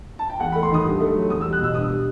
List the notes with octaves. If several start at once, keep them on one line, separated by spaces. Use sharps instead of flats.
A5
G5
E2 F#5
A3 B5
C6
D#3 D#6
G2
A3
F#3
E2 D#6
G3 E6
F#6
B2 E6
G2 D#6
G3